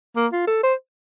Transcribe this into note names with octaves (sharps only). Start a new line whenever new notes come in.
A#3
F4
A4
C5